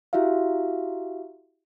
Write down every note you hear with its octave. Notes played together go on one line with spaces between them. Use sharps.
E4 F#4 G4 E5 F5